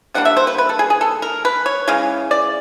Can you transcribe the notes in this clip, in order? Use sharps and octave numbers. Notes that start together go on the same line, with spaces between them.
D3 G3 A#3 D4 F#5
E5
C5
B4
B4
A4
G#4
G#4
A4
A#4
B4
C#5
C#3 E3 G#3
D5